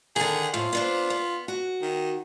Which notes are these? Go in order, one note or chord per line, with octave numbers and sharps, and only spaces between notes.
D3 D#3 G#4
F2 A2 F4
B3 D4 C5
B3
F#4
D#3